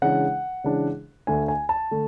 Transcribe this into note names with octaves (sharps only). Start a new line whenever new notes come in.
C#3 E3 G#3 D4 F#5
C#3 E3 G#3 D4
D2 D3 A3 D4 G#5
G#5
A5
D3 A3